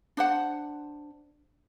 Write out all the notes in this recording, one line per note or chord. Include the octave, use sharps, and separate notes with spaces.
D4 C5 F#5